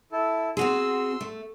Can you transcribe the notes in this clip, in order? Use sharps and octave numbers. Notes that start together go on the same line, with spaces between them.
E4 A4
C4 F#4 G#4 C6 E6
A3